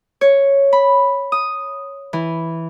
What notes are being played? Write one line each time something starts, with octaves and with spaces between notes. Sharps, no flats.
C#5
B5
D#6
E3